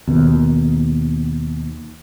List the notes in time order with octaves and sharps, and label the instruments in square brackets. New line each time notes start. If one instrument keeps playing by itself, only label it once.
[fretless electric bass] D#2 B2